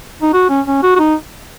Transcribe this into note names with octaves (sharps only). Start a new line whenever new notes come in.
D#4
F#4
C#4
C#4
F#4
F#4
D#4